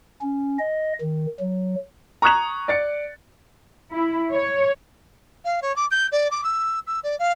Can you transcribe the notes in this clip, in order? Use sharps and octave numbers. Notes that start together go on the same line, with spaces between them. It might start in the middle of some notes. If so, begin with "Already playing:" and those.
C#4
D#5
D#3
F#3
A#5 C#6 D#6 F#6 G#6 F7
D5 A6 C#7
E4
C#5
F5
C#5
D6
G6
D5
D6
E6
E6
D5
F5